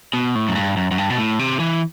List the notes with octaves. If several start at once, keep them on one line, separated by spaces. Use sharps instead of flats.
B2
A2
F#2
G2
F#2
F#2
G2
B2
A2
C3
E3